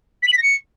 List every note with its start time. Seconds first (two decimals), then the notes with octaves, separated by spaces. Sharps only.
0.23 B6
0.28 F#7
0.33 B6
0.38 A#6
0.43 C#7